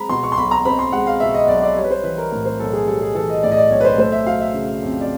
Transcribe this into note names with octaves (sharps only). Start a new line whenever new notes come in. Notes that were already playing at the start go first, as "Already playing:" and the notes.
Already playing: G#3 C4 A#5 B5
B2 C6
C#6
C6
B1 B5
A#5
C4 B5
C6
G#3 F#5
F5
B2 E5
D#5
B1 D5
D5
G3 C#5
B4
C5
E3 B4
A#4
A2 A#4
C5
B1 A4
G#4
G3 A4
G#4
E3 A4
D#5
A2 D5
D#5
D5
B1 C#5
B4
C5
A3 C5
E5
F#3 F5
E5
C#3
F2
D5